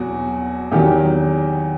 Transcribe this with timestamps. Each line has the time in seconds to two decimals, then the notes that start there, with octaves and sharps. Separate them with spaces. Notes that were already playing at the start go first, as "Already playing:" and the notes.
Already playing: E2 B2 F#3 F#4
0.72 E2 D#3 F#3 G4